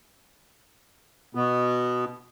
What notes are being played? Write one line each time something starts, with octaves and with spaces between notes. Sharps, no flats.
B2 B3